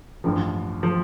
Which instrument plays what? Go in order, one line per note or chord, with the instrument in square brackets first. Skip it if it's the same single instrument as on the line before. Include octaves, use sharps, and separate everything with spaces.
[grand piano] A1 G2 F3
F3